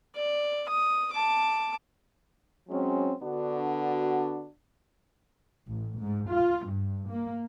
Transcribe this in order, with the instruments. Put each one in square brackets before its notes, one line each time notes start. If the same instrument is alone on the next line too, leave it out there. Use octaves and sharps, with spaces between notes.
[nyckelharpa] D5
D#6
A5 D6
[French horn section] F#3 G#3 C4 C#4
D3 B3 D4 F#4
[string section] A1
G#2
F4
G2
A#3